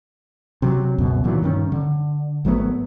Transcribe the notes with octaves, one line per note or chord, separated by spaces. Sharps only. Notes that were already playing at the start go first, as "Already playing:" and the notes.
C3 F#3
C#2 F#2 B2
A#2 D#3 E3 F#3
G2 D#3 C#4
D3
G#1 F#3 A3 B3